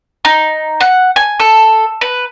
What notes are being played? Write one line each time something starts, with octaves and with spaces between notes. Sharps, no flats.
D#4
F#5
G#5
A4
B4